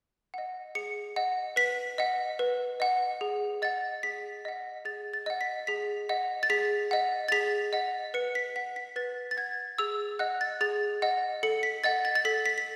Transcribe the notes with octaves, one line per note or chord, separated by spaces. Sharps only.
D#5 F#5
G#4 C#7
D#5 F#5
B4 B6
D#5 F#5
B4
D#5 F#5
G#4
D#5 F#5 A6
G#4 B6
D#5 F#5
G#4 A6
A6
D#5 F#5
B6
G#4 B6
D#5 F#5
A6
G#4 B6
D#5 F#5
A6
G#4 B6
D#5 F#5
B4 C#7
B6
F#5 B6
B6
B4 A6
A6
F#5 G#6
G#4 E6
D#5 F#5 F#6
A6
G#4 A6
D#5 F#5
A4 C#7
B6
D#5 F#5 A6
A6
A6
A4 B6
B6
B6